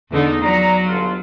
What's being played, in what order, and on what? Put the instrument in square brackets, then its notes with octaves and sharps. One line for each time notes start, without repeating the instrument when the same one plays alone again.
[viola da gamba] E2 D3 D#4
[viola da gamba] F#3 [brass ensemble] D5 A#5
[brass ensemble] G1 F4